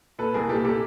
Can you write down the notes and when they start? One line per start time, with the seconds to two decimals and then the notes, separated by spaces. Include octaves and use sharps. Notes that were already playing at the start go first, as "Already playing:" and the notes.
0.19 A#2 A4 B4
0.34 C2 G#4 A#4
0.49 A#2 G4 A4
0.65 A#2 G4 A4